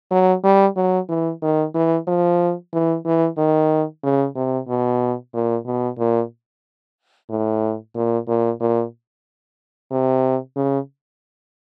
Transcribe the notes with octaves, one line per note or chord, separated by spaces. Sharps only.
F#3
G3
F#3
E3
D#3
E3
F3
E3
E3
D#3
C#3
C3
B2
A#2
B2
A#2
A2
A#2
A#2
A#2
C3
C#3